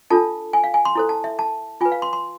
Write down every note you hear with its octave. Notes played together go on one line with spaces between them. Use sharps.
D4 F4 A4 A5
G#5
F5
G#5
C6
E4 A4 C5
A5
E5
A5
F4 B4 G#5
F5
C6
C6